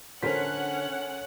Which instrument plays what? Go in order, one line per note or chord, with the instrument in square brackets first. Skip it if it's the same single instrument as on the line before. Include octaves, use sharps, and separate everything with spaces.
[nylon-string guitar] D3 [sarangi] C#4 [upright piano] A#4 C5 B6 [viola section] F#5